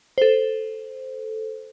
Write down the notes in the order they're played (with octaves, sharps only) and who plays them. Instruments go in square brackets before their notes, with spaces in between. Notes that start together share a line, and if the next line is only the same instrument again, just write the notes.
[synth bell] A4 C5